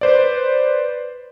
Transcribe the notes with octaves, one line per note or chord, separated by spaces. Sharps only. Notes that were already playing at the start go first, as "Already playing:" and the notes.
B4 C5 D5